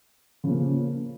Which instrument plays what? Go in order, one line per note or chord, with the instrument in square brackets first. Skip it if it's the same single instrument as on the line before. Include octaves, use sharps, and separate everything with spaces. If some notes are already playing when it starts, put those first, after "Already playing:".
[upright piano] C#3 F3 A#3